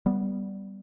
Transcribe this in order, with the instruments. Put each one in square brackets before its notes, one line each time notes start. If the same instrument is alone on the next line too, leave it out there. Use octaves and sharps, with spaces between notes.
[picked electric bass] G3 B3